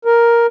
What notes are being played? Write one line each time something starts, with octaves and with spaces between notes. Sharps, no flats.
A#4